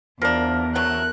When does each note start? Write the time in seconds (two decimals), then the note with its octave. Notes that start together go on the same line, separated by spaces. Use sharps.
0.22 E2 F3 D4 A#4
0.75 D3 F#3 A3 F#6